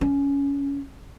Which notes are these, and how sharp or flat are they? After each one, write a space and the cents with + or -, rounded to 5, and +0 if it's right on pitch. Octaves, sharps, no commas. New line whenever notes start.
C#4 +15